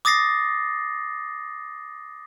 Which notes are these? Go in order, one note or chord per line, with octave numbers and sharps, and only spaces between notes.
D6 D#6 A6 A#6 C7